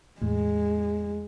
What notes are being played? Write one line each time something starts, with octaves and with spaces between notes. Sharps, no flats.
E2 A2 G#3